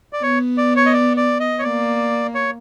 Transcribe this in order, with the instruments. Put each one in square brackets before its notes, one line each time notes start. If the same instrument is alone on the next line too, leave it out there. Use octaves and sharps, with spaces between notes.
[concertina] D5
[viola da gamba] B3 [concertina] C#5
[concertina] D5
C#5
D#5
D5
D5
D#5
C#5
[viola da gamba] A#3 [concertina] D5
[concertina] C#5